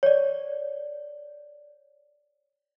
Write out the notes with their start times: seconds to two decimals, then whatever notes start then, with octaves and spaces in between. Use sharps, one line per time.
0.03 C#5 D5